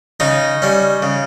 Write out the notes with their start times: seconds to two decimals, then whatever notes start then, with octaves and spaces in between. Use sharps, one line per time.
0.20 C#3 D#4
0.62 G3 C#4
1.02 C#3